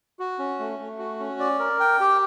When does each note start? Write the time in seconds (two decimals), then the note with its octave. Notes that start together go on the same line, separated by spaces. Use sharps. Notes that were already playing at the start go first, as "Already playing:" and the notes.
0.19 F#4
0.39 C#4
0.59 A3
0.79 A3
0.99 F#4
1.19 C#4
1.40 D5
1.60 A#4
1.80 G5
2.00 G4